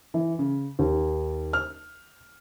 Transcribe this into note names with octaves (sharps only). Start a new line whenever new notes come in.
E3
C#3
D#2
F6